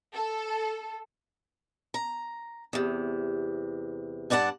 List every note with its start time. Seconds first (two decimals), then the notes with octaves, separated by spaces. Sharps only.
0.14 A4
1.94 A#5
2.73 E2 C3
4.30 G2 D4 D5 F#5 A5